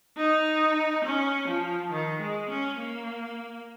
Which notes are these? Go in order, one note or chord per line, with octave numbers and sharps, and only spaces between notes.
D#4
C#4
F3
D#3
G#3
C#4
A#3